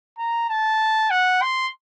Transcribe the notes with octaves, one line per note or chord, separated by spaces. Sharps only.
A#5
A5
F#5
C6